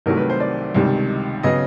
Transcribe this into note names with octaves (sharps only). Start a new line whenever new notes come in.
C2 C3 D#3 F#3 A3 A#4
B4
C5
D5
C#2 C3 D#3 G3
C#3 F#3 B3 D#5